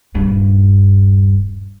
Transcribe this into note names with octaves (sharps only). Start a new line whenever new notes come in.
D#1 G2